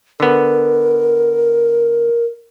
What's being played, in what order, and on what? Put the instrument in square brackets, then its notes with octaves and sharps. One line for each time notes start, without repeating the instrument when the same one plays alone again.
[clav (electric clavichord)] D3 B3 [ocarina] A#4